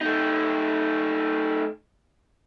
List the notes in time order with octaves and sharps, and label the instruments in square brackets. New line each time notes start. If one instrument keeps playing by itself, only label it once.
[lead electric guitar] A3 D#4